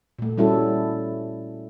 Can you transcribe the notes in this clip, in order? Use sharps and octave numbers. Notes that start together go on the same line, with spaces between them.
A#2 A3
G3 C#4 E4 F#4 A4